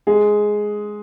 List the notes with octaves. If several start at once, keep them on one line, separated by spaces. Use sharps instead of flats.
G#3 G#4